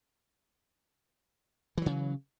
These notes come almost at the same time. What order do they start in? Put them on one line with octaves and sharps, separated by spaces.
E3 F#3 C#3